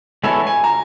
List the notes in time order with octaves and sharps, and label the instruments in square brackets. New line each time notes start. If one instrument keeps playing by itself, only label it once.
[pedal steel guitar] G#3 B3 E4 A4 C#5 [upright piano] G#5
[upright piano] G#5
A#5